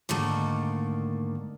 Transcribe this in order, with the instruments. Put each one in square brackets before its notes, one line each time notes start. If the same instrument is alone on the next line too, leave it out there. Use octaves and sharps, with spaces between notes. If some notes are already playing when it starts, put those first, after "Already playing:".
[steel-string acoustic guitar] G#2 D3 D#3 A3 A#3